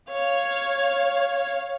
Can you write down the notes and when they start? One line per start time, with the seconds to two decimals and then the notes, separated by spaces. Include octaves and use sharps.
0.10 C#5 F5